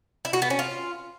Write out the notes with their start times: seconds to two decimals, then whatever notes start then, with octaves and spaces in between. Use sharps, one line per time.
0.25 E4
0.33 F#4
0.42 B3
0.50 C#4
0.59 F4